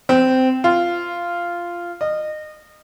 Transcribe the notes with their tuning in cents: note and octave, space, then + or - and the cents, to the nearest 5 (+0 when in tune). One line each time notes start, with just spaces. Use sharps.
C4 -15
F4 -10
D#5 -25